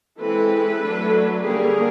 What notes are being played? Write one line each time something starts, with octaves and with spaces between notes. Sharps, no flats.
E3 G#3 C4 A4 B4
F#3 A3 D4
D3 G3 A#3 C#4 G#4 A#4